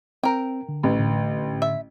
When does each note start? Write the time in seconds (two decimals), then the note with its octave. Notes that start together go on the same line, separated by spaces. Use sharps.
0.23 C4 A#4 G5
0.69 D3
0.83 A1
0.99 A2 D3
1.62 E5